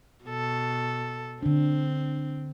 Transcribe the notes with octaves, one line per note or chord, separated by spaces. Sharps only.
B2 A4
D3 C4 D4